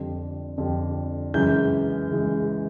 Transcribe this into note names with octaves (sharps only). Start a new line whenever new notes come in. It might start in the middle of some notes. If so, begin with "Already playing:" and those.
Already playing: F2 D3 G3
F2 D3 G3
F#2 C#3 E3 G#3 G6
C#3 E3 G#3